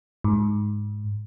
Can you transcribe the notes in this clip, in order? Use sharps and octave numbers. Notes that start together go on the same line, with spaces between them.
G#2